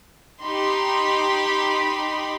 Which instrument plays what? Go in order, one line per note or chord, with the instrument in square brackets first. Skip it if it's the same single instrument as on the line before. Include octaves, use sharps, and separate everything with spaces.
[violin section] D#4 G4 B5 C6